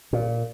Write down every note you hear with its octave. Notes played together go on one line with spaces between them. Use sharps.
A#2